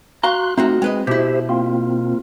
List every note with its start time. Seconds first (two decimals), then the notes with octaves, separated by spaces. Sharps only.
0.23 F#4 F5 A#5 C6 F#6
0.58 A3 C4 D#4 F4 F#4
0.82 G#3 C4 B4 D#5
1.07 B2 E4 G4 C5 E5
1.49 A#3 C4 F4